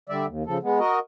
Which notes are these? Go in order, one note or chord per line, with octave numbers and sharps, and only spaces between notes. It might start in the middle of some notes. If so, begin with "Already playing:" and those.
D3 G3 D5 E5
D#2
C#3 F3 A4
G#3 B3
F#4 A#4 D#5